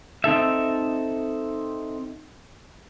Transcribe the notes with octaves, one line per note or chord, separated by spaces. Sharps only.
C4 D#4 A4 E5